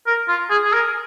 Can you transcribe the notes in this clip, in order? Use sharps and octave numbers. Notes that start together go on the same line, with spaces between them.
A#4
F4
G#4
G#4
A#4